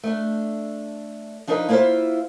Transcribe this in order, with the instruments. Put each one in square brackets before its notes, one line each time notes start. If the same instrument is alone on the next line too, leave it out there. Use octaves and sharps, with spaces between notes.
[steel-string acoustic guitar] A3 D4
F3 D4 D#4 A#4 B4
A#3 E4 F4 A4 C5 E5